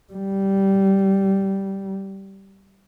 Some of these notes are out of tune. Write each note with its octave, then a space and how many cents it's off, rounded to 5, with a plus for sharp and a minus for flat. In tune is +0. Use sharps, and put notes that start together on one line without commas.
G3 -10